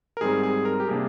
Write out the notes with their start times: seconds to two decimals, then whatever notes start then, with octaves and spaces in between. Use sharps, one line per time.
0.17 A#4
0.21 G#2 G3 C4 G#4
0.43 G#4
0.65 A#4
0.80 G4
0.88 C3 G3 A#3 D4 G#4